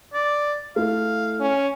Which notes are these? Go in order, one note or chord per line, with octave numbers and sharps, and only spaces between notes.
D5
A3 E4 F5
C#4